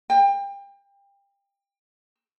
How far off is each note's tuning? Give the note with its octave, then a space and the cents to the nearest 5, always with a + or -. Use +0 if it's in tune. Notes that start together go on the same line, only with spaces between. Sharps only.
G5 +25